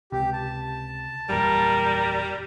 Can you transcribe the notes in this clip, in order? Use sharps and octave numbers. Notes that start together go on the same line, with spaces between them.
C#2 C3 G4
A5
F#1 E2 A#2 G3 A#4